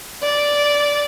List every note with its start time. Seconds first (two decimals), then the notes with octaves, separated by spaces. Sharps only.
0.23 D5